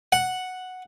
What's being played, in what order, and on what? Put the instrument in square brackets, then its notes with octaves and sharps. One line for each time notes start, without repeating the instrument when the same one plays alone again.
[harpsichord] F#5